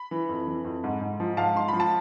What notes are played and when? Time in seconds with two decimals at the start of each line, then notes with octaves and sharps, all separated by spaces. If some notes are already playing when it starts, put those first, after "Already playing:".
Already playing: B5
0.11 E3
0.29 F2
0.47 E3
0.65 F2
0.84 G#2
1.01 G#2
1.20 F3
1.37 G#2 F5 A5
1.55 G#2 C6
1.68 F3 B5
1.80 A5